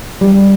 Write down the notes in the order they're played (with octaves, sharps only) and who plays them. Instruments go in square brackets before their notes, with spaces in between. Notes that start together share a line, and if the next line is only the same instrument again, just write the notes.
[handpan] G3